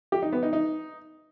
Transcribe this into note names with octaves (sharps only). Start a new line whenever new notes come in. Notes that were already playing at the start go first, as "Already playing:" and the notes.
G4
D#4
B3
D#4
D#4